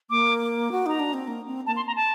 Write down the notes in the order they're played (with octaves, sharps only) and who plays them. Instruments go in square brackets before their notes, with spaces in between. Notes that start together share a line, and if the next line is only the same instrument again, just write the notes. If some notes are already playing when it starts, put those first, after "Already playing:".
[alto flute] A#3 [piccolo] D6
[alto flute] F#4
[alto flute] D#4 [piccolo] A#5
[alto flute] D4
C4
A#3
C4
[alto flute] A#3 [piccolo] A5
[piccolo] C6
A#5
A5